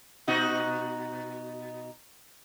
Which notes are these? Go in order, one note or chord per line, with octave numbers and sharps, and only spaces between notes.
B2 D#4 F#4